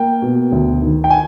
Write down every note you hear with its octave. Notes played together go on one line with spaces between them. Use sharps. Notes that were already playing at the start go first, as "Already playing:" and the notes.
Already playing: A#3 G5
B2
D2
D#3
G5
G#5